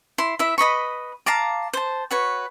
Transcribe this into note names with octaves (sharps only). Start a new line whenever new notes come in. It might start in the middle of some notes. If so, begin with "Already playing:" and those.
E4 C6
E4 E5
B4 D#5 B5 C#6
F5 A5 A#5 D6
C5 A5
F#4 B4 C#5